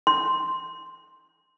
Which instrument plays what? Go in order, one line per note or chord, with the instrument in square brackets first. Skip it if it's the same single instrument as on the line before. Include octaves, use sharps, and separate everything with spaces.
[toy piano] C6